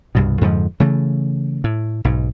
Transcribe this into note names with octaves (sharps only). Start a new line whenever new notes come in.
C2 G2 B2
F2 G#2 D3 F3
C#3 E3 A3
A2
B1 G#2